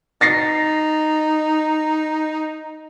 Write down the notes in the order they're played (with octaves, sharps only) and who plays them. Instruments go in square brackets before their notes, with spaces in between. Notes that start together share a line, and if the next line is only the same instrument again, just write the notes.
[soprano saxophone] D#4 [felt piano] A6 A#6 C7